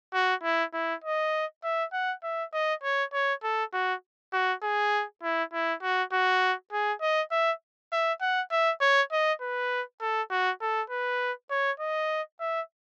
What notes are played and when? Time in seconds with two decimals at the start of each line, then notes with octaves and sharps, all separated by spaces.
0.14 F#4
0.43 E4
0.73 E4
1.04 D#5
1.64 E5
1.93 F#5
2.23 E5
2.53 D#5
2.83 C#5
3.13 C#5
3.43 A4
3.73 F#4
4.33 F#4
4.63 G#4
5.23 E4
5.53 E4
5.82 F#4
6.12 F#4
6.72 G#4
7.02 D#5
7.32 E5
7.92 E5
8.21 F#5
8.51 E5
8.81 C#5
9.12 D#5
9.41 B4
10.01 A4
10.31 F#4
10.62 A4
10.90 B4
11.51 C#5
11.80 D#5
12.40 E5